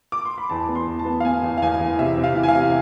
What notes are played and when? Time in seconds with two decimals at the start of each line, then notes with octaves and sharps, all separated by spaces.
0.12 D6
0.25 C6
0.38 B5
0.50 E2 A5
0.68 B3
0.75 C6
0.87 E2
0.99 A5
1.05 B3
1.20 F5
1.25 B3 G#5
1.43 E2
1.58 F5
1.62 E2 G#5
1.80 E2
1.99 C3 E5
2.18 C3
2.24 F5
2.36 E3
2.43 G#5
2.48 F5
2.55 C3